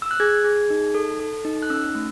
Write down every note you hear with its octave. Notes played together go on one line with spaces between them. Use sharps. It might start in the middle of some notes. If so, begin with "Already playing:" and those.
E6
F#6
G#4 G#6
G#4
D#4
A4
A4
D#4
F#6
C#4 E6
A3